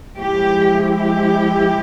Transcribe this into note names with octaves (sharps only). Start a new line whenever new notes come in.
F3 G#3 E4 G4
G4